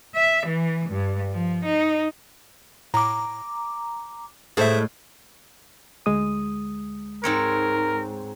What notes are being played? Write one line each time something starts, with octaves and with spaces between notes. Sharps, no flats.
E5
E3
G2
F3
D#4
A2 A#5 D6
A2 G#3 G#4 A4 C5 E5
D2 G#3 D#6
G#2 C4 A#4 C#5